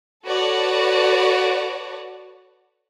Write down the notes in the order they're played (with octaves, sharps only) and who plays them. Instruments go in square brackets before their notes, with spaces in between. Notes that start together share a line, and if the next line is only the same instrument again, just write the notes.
[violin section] F#4 A4 B4 C#5 D5 F#5